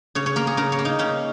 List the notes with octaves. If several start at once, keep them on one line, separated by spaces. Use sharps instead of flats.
C#3 C#5
C#5
A#3 A#4
G#4
C#3 A#4
C#5
A#3
D#4
C#3 C#4